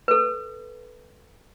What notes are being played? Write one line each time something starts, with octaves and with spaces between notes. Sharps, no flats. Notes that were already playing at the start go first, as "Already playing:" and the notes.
A4 B4